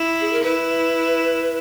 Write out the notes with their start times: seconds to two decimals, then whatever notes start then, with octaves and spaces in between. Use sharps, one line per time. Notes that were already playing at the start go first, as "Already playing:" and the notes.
Already playing: E4
0.21 G#4
0.32 A#4
0.43 E4 B4